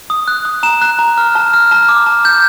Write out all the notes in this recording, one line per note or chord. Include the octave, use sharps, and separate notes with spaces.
D#6
F#6
D#6
A#5 E7
F#6
A#5
F6
A5
F6
A5
D6
A5
G6